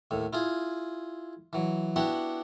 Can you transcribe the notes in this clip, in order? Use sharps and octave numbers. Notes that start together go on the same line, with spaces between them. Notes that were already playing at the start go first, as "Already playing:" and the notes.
D#2 A2
E4 F4 G#4
E3 F#3
B3 D4 E4 F#4 G4 F#5